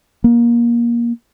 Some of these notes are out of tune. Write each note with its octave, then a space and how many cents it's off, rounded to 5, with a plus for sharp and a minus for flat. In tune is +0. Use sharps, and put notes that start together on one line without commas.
A#3 +20